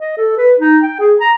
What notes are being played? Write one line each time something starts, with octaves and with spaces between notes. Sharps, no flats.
D#5
A4
B4
D#4
G5
G#4
A#5